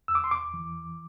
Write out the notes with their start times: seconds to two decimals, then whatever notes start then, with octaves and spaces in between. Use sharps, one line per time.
0.08 E2 E6
0.15 D6
0.24 C6
0.31 D6
0.54 E3